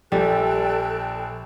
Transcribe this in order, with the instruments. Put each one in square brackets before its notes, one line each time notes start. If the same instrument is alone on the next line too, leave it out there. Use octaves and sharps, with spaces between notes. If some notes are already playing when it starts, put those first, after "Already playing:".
[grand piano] A#1 [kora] G3 [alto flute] A4 [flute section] G5 A5 F#6